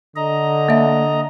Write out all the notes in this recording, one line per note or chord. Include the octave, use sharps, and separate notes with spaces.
D3 D#5 A#5
A#3 E5